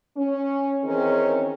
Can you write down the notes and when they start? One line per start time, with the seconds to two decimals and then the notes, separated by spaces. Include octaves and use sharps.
0.16 C#4
0.84 D#3 E3 C4 C#4 G#4 A#4